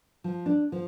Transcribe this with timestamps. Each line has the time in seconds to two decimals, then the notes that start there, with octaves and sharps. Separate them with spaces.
0.24 F3
0.46 D4
0.72 F3